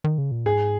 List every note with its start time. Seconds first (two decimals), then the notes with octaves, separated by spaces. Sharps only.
0.04 D#3
0.18 C#3
0.31 A#2
0.45 G#2 G#4